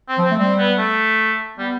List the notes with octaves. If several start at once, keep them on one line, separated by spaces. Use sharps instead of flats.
C4
F3
C4
A3
G3 C4
B3
A3
G3 B3